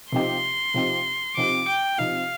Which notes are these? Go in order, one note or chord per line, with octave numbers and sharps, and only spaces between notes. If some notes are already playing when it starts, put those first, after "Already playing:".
C3 F3 C4 D#4 G4 C6
C3 F3 C4 D#4 G4
C3 F3 C4 D#4 G4 D6
G5
C3 F3 C4 D#4 G4 F5